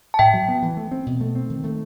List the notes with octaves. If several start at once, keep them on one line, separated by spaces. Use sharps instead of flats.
A5
A2 E5 G5
F#3
B3
E3
A3
C4
B2
A3
C4
D#3
A3